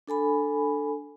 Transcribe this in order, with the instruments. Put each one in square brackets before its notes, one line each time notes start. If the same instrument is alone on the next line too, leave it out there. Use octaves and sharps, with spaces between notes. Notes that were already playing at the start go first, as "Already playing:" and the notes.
[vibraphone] D4 A4 G#5 B5